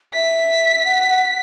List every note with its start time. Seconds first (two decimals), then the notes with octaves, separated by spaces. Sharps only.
0.14 E5 B6
0.75 E5
0.85 F#5
1.08 F#5